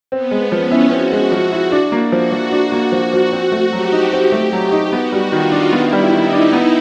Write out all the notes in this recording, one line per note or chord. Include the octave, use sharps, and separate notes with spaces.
B3 C4
G#3
F3 C#4
E4
C4 F#4
G#3
F3 F#4
E4
D4
A#3
F3 F#4
F3
D4 F#4
A#3
F3
F3
C4
A3
F#3 G4
D#4
C4
A3
F#3
D#4
B3 F#4
G3
D#3 F4
D4
B3 E4
G3
D#3 D#4
D4
B3